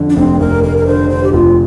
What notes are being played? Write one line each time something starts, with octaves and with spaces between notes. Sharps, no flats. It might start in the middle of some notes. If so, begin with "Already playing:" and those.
Already playing: F2 D3
D4
F1 C4
F1 A#4
F1 A#4
A#4
D3 C5
D3 C5
G4
F1 F4